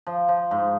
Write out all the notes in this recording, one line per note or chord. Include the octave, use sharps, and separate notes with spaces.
F3
F3
G#2